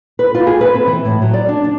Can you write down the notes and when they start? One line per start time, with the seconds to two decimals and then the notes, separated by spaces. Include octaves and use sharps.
0.19 B4
0.35 F4
0.47 G#4
0.61 B4
0.74 C4
0.87 E3
1.05 A2
1.22 F#3
1.33 D5
1.48 D4
1.64 D4